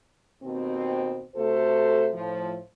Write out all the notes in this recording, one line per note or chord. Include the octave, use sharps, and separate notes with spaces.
D#2 B2 C4
C3 A3 F#4 A4 C5
A2 F3